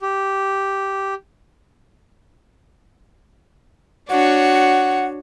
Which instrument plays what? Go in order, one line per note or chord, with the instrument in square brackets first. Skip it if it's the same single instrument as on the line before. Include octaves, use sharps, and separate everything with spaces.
[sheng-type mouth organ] G4
[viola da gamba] D4 F#4 C#5 [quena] F#5